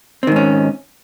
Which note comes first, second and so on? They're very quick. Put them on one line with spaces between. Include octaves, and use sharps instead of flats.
C4 D#3 G#2 C#4